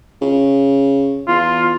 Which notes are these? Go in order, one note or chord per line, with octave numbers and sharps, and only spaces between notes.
C#3
E2 F4